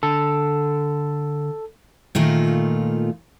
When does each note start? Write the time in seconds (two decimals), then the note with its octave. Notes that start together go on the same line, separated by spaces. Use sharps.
0.03 D3 A4
2.15 A#2 D#3 A3 F4